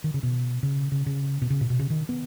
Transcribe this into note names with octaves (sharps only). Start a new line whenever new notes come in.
D#3
C#3
B2
C#3
C#3
C#3
B2
C#3
A#2
B2
C#3
D#3
B3